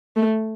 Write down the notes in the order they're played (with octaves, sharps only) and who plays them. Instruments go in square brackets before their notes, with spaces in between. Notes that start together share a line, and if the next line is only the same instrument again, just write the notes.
[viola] A3